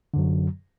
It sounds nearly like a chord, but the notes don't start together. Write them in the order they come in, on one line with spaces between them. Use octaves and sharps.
D3 F#2 F#3